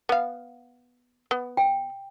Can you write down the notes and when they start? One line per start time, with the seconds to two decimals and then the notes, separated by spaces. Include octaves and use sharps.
0.09 B3 F5
1.31 B3
1.57 G5